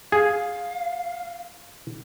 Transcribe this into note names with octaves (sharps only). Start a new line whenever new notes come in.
G#4 F5